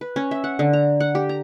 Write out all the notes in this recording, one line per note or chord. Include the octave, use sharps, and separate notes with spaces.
B4
C#4
E5
F#5
D3
A#5
F#5
G4
A#5